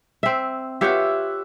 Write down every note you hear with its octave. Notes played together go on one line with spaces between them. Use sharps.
C4 E5
F4 G4 C#5 E5 F#5